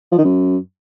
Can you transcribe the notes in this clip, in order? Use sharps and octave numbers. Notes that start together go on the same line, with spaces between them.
F3
D#3
F#2